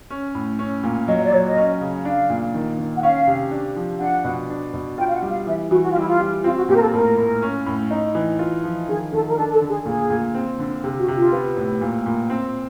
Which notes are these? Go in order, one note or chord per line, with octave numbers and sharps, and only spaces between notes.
C#4
A2
C#4
A#2
F#3 D#5
D5
F#3 C#5
D#5
C#4
C#3
D4 F5
A#2
D#3
D#3
F#5
C#4 F5
C3
D4
F3
D4 F#5
B2
D4
B2
F4 G5
F5
F#5
G3
F5
E3 E5
E3 F#4
F#4
F4
G3 E4
F4
G3
C4 F4
F#4
A#2 G4
A#4
A4
A2 A#4
A2
C#4
A2
D#4
E3
F4
F3
D#3 G#4
D#3 A4
A#4
D4 A4
A4
D3
G#4
A#2 G#4
A#2
C4
D3
C3 G#4
F#4
C3
F4
B3
A2
A#2
A#2
C4